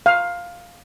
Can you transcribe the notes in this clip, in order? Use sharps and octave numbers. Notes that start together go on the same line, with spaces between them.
F5